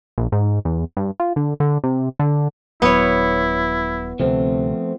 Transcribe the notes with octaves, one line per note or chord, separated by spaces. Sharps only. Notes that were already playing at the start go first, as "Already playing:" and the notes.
A#1
G#2
E2
G2
F4
D3
D3
C3
D3
D#1 F#3 B3 E4 C#5
D2 C3 F3 A3 C4